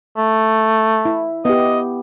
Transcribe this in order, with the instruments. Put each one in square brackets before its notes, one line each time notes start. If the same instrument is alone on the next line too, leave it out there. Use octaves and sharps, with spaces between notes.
[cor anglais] A3
[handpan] E4
[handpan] B3 G4 [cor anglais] D#5